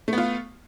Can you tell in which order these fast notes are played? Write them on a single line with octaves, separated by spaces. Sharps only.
A3 B3 F4